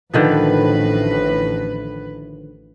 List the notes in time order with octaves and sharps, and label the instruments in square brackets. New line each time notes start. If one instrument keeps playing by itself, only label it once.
[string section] A1 A2 B4 [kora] D3 D#3 F3